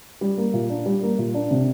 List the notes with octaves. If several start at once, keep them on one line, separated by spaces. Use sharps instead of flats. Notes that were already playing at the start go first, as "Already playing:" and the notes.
G3
A#3
A#2
D4
G3
A#3
A#2
D4
C3